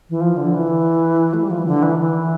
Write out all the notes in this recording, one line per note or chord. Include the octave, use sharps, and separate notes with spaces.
E3
F3
D3
E3
A3
G3
F3
E3
D3
E3
E3